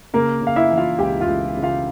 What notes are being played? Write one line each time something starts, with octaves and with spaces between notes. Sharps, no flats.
C#3 A#3 A#4
C#3
F5
E4 E5
E3
F4 F5
C#2 G4 G5
F4 F5
C#2
C#3
F4 F5